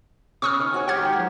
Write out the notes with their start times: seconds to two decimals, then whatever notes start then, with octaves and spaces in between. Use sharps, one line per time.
0.42 C#3 C#6 D#6 F6
0.60 D#3
0.74 F#4 G#4 C#5
0.88 D#3 G#3 F#4 G4 F#5 F6 G#6
1.16 F3 F#3